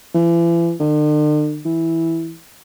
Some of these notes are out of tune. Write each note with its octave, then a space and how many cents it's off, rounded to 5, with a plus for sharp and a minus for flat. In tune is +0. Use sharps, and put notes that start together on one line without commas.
E3 +40
D3 +45
E3 -5